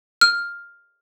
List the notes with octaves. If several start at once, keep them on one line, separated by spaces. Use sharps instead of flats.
F6